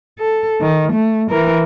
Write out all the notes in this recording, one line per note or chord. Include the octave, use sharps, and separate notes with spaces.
A4
D#3
A3
E3 A#4